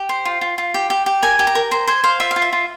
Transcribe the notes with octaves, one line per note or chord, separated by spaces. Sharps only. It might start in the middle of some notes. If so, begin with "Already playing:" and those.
Already playing: G4
C5
F4
F4
F4
G4
G4
G4
A#4 G#5
G4
A#5
A#4
C5 A#5
C5 G#5
C5 F5
F4 E5
F5
F4
E5
F4